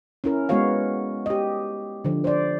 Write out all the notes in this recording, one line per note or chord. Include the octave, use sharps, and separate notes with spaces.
C#4 E4 A#4
G#3 B3 F#4 C#5 F5
G4 D#5
D3 F3
C5 D5